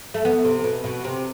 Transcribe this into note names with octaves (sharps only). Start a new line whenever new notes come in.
A3
B3
C3
B2
B2
C3